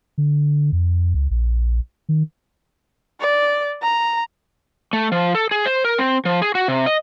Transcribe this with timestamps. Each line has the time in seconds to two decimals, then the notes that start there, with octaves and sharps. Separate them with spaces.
0.18 D3
0.72 F2
1.14 C#2
1.31 A#1
2.09 D#3
3.20 D5
3.83 A#5
4.93 A3
5.12 F3
5.35 A4
5.51 G#4
5.66 C5
5.85 A#4
5.98 C4
6.25 F3
6.42 G#4
6.55 F#4
6.68 C3
6.86 D#5